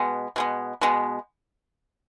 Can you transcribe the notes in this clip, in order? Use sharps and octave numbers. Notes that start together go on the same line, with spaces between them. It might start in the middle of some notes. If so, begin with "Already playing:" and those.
Already playing: B2 G#3 B3
B2 G#3 B3
B2 G#3 B3